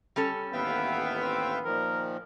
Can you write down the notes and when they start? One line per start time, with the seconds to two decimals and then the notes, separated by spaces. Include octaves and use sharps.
0.16 G3 C#4 A4
0.53 A1 D#2 B3 B4 E5 F5 G5
1.21 C4
1.65 A#2 D#3 F3 A#4